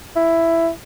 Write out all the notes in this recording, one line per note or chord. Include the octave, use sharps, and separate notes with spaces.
E4